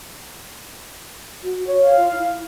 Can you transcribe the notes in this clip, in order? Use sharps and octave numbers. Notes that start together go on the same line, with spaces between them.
F#4
C#5
F5
F4
E4